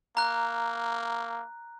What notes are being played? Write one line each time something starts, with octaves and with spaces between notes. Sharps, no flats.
A#3 A#5 F#6